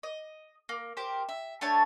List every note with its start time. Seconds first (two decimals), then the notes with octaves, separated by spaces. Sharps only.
0.03 D#5
0.69 A#3
0.97 G4 A#4 C5
1.29 E5
1.61 A3 D4 C#5 A5